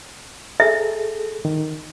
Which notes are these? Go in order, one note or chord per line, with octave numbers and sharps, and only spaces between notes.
G#4 A4 E5
D#3